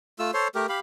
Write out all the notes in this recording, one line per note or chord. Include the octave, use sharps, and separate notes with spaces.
A3 F4 E6
A4 C5 C#5 C6
A3 G4 A#4
G4 F5 B5